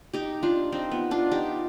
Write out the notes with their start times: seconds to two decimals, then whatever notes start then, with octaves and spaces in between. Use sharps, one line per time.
0.13 D#4 G4
0.43 D4 F4
0.72 C4 D#4
0.91 B3
1.11 D4 F4
1.31 D#4 G4